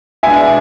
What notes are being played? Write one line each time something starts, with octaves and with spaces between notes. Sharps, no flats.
B2 G#3 D4 E5 G#5